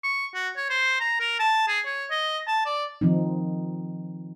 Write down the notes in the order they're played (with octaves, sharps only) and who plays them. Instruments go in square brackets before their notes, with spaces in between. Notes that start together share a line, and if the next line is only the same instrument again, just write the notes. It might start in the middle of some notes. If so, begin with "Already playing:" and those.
[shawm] C#6
F#4
C#5
C5
A#5
A#4
A5
G#4
C#5
D#5
A5
D5
[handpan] D#3 F3 C4 D#4